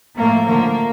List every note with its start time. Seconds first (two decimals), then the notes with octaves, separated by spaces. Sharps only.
0.17 A2 F3 A3 A#3
0.45 D3 F3 A3 A#3